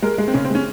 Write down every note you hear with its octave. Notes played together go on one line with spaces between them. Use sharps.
G#3 A#4
G#3
C4
C#3 C#4
C4
G#3 C#4